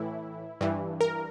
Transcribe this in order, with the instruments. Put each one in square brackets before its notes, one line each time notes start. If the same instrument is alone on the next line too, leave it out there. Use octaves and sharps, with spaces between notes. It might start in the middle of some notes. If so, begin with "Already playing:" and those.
Already playing: [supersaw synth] A2 E3 E4
G2 E3
A#4